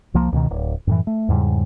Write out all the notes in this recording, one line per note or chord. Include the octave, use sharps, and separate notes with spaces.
C2 F3 A#3
C#2 B2 D#3
D1
F#2 A2 E3
A3
E2 G#2 C#3 G3